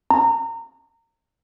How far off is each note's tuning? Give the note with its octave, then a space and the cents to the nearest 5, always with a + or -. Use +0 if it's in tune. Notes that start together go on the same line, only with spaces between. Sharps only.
A#5 -25